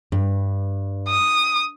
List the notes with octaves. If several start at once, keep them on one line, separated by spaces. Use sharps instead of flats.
G2
D#6